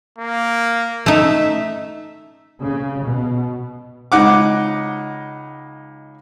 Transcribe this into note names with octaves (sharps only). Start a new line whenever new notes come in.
A#3
A3 D#4 E5
C#3
B2
C#2 D#4 F#5 D6